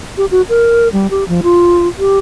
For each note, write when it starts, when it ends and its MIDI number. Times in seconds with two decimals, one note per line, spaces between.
0.17 0.26 67
0.31 0.42 66
0.49 0.88 70
0.93 1.07 55
1.11 1.24 67
1.28 1.41 53
1.43 1.88 65
1.99 2.19 67